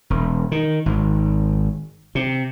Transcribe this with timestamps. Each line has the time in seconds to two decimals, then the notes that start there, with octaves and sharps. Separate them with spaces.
0.10 E1
0.52 D#3
0.86 G#1
2.15 C3